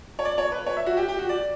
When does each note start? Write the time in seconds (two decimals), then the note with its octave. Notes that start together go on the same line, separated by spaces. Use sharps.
0.19 C#5
0.25 D5
0.38 C#5
0.52 B4
0.66 C#5
0.77 E5
0.86 F#4
0.97 G4
1.08 G4
1.19 F#4
1.29 D5